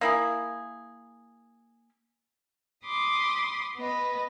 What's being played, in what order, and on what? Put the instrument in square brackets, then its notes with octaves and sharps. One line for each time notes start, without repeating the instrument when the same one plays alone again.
[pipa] A#3 E4 G#4
[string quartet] B5 C6 D6 D#6
B3 B4 D#5